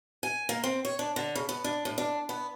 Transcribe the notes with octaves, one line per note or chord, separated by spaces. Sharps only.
G#5
A#3
C4
C#5
D4
D3
C#3
B3
D4
A2
D4
B3